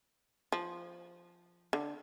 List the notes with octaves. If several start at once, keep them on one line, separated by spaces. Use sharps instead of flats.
F3
D3